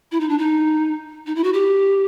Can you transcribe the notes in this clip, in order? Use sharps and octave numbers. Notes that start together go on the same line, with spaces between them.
E4
D#4
D4
D#4
D#4
E4
F#4
G4